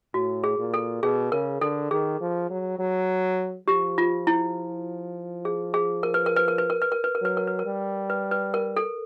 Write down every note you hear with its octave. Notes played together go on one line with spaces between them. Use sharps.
A2 F#4
G#4
A#2
A4
B2 G#4
C#3 A#4
D3 A4
D#3 G#4
F3
F#3
F#3
F3 G4
F4
E4
G#4
G#4
A#4
B4
A#4
B4
A#4
B4
A#4
B4
A#4
B4
A#4
F#3 B4
A#4
B4
A#4
G3
B4
B4
A#4
A4